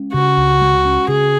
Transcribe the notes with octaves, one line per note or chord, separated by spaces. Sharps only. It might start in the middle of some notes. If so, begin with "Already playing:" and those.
Already playing: G#3 C#4
C#3 F#4
C#2
G#3
C#4
C#3 G#4